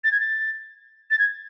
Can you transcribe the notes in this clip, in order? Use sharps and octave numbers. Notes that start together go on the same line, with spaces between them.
A6
G#6
A6
A6
G#6